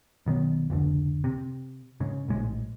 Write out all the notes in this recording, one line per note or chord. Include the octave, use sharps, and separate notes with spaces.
B1 D#3 B3
F1 C#2 D3
C3
G#2 C#3
A#1 A2 G#3